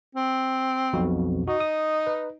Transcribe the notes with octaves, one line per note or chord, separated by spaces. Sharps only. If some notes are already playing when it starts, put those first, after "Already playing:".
C4
B1 F2 B2
D#4 F#4
D#6
B4